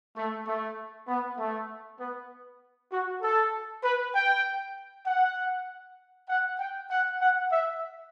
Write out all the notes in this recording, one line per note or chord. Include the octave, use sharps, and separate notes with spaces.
A3
A3
B3
A3
B3
F#4
A4
B4
G5
F#5
F#5
G5
F#5
F#5
E5